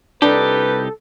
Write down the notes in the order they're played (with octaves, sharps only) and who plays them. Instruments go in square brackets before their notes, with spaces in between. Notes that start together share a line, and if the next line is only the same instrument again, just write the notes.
[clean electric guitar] C2 D#4 G4 [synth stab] D4 [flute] A4 [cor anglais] B4